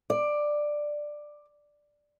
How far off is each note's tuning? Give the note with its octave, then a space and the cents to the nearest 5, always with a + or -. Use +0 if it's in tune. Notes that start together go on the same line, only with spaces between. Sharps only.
D5 +10